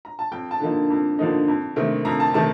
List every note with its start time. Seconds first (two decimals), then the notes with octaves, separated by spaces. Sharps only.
0.05 A#5
0.19 A5
0.31 F2 G5
0.51 A5
0.60 D3 F3 A#3 D#4
0.90 F2
1.19 D3 F3 A#3 D#4
1.48 F2
1.76 C3 D#3 A3 C4
2.05 F2 A#5
2.20 A5
2.34 C3 D#3 A3 C4 A5